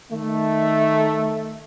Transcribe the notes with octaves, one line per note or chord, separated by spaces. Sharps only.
D#3 A3